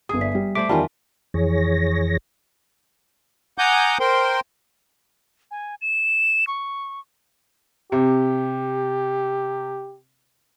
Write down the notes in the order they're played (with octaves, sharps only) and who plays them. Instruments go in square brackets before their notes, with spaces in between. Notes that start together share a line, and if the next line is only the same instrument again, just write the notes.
[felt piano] G1 D#6 [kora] G#4
[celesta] D5 E5 B6
[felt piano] G3
[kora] A3 C5 D5 [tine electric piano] D6 [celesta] B6
[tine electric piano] E2 G3 [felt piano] D#3 [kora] F4 F#4 B4 [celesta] G#5 A5
[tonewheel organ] F2 E3 G#4 C#5 A#6
[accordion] F#5 G#5 A#5 D6 D#6 G6
A#4 C5 G5 C6
[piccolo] G#5
E7
C#6
[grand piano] C3 [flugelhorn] G4